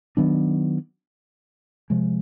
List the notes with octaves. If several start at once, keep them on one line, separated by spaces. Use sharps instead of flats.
D#3 F#3 B3 D4
C3 F3 G#3